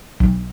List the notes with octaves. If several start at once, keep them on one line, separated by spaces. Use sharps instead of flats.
B1